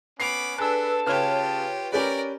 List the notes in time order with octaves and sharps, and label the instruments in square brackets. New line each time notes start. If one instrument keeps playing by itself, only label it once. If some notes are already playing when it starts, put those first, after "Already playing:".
[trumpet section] B3 C#4 [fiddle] B5 D6 [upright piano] C7 F7
[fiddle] D4 A4 [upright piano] G#4 [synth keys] B4 E6 [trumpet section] A5
[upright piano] C#3 F6 [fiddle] F4 G4 [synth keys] B4 C#5
[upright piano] C#4 G4 B4 [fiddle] A#4 D5